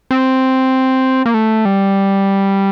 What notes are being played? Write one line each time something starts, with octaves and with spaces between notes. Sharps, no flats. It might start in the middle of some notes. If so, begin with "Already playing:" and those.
C4
A#3
A3
G3